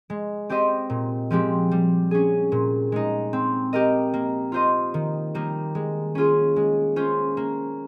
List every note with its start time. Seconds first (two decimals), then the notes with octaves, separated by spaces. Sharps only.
0.10 G#3
0.49 C4 G4 C5 D#5
0.90 A#2
1.31 F3 G#3 C4 G4
1.71 G3
2.11 C#4 G#4
2.52 A#2
2.92 G#3 D#4
3.33 C4
3.73 G4 A#4 D#5
4.14 A#3
4.52 F4 C5 D#5
4.94 D#3
5.35 G3 A#3 D#4
5.75 G#3
6.15 C#4 F4 G#4
6.56 G#3
6.96 C#4 F4 C5
7.37 A#3